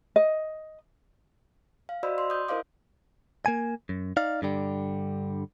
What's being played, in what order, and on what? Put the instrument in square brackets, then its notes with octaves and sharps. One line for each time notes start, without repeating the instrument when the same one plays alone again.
[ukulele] D#5
[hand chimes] F5
F#4 C5 D5 D#5 B5 E6
C6
D#6 G6
E4 A#4 C5 D#5 F5 D6
[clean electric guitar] A#3 G#5
F#2
D#4 D5 F5
G2 D3 G3